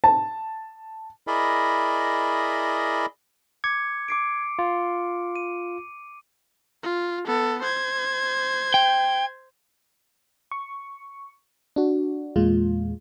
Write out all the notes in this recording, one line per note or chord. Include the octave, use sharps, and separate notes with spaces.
A5
E4 G#4 A#4 D5 D#5 B5
D6 G#6 C#7
D6 C7 D7
F4
D#7
F4
B3 A4
C5 G#6
G5
C#6
D4 F#4
E2 A#2 G#3 F4